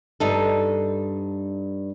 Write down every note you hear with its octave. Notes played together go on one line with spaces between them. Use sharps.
G2 D#4 A4